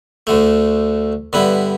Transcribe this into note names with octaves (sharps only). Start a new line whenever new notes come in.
D2 D3 A3
G2 D3 B3 E4